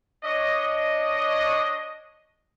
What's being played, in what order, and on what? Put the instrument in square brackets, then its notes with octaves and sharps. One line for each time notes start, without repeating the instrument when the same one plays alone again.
[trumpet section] D4 C#5 D#5